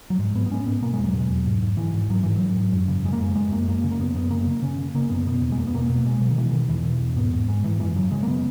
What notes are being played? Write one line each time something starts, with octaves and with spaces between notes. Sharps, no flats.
F#3
G#2 G#3
G#2 B3
B3
G#2 C#4
G#2 B3
B2 A#3
G#3
E2 F#3
B2
E2
G#2
G#2
G#2 E3
G#2
G#2 F#3
G#2 E3
F#3
G#2
G#2
F#2
C#3
F#2 G#3
A#3
F#2 G#3
F#2 G#3
F#2 A#3
F#2 A#3
C#3
A#3
F#2 B3
F#2 B3
C#3 A#3
C#3
C#3 C#4
C#3
C#3 A#3
F#2 B3
B2 B3
E2
G#3
E2 A#3
B3
B2 A#3
B2
A#3
B2 G#3
B2 F#3
D#3
B2 E3
B2 D#3
E2 E3
B2
E2
G#2 B3
G#2
G#2 G#3
G#2 E3
F#2 E3
C#3 F#3
C#3 G#3
A#3
C#3 B3